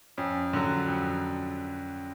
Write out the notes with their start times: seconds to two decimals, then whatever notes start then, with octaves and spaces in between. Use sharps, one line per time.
0.18 F2 C#4
0.53 D3 F#3
0.88 F2